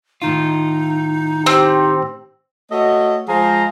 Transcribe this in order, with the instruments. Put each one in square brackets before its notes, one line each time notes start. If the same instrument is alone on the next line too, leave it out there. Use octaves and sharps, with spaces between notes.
[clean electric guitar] A2 D#3 F4 [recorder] D#4
[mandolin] C4 [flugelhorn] G4
[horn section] A3 F#4 C#5 D#5
F3 G#3 G#4 C5 F5 A#5